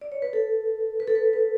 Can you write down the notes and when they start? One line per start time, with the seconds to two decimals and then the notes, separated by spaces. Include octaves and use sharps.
0.01 D5
0.12 C#5
0.22 B4
0.33 A4
1.00 B4
1.07 A4
1.15 B4
1.33 B4